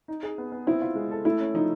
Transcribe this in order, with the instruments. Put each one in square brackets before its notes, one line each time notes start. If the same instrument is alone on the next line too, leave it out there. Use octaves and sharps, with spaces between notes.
[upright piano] D#4
G#4
B3
B3
[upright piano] C4 [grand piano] E4
[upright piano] F4
G#3
A4
[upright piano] A3 [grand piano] E4
[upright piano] C#4
[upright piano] F3 [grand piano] D#4